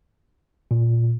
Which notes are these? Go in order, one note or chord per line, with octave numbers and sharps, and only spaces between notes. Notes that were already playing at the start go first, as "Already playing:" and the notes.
A#2